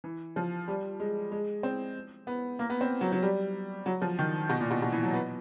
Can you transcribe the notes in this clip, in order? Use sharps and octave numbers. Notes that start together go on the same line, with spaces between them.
E3
F3
G3
G#3
G#3
C4
B3
A#3
B3
C4
F#3
F#3
G3
F#3
F3
D#3
B2
A#2
B2
B2
E3
F#3
B3